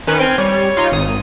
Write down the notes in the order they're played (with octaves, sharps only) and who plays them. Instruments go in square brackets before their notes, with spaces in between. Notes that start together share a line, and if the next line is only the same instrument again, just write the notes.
[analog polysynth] D#3 C#4 B4
[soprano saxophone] C4 [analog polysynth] G5 G#5 F6
[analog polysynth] G3 [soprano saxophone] C#5
[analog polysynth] D#4 F4
G#1 D#6